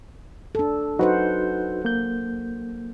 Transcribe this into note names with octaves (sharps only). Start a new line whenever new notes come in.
D4 A4
F#3 D#4 F#4 B4 C5 F#5
A#3 G6